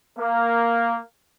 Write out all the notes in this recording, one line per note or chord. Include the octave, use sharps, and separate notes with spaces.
A#3